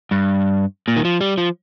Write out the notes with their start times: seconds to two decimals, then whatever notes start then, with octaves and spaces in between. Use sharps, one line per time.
0.11 G2
0.88 A#2
0.97 D#3
1.05 F3
1.21 G3
1.38 F3